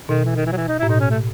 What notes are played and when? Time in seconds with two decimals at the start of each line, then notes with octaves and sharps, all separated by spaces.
0.09 B2 D#3
0.25 E3
0.36 D#3
0.46 E3
0.52 F#3
0.57 E3
0.68 D#4
0.79 E4
0.83 A2
0.89 B2 D#4
1.00 C#4
1.10 A3